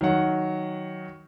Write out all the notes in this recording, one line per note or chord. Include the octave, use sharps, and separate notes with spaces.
D#3 F#3 F#5